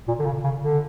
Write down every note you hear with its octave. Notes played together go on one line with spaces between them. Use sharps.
A#2
D3
C#3
C#3
D3